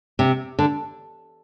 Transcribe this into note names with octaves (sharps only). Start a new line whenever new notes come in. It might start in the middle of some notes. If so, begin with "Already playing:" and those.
C3
D3